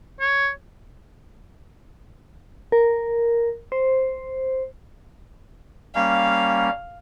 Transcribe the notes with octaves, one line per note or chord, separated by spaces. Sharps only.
C#5
A#4
C5
G3 A#3 C#4 F5